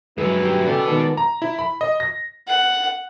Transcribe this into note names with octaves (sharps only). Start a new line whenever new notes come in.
G2 F#3 G#3 E4 B4
G4
C#3 F#4 A4 B4 D5 G5
D#3 G#3 B3
A#5
E4
B5
D#5
A#6
F#5